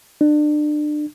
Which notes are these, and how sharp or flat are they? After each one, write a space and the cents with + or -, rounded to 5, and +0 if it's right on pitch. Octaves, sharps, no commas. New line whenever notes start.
D4 +30